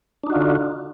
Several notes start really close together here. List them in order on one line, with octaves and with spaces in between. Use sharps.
D4 D#4 F#4 F4 D3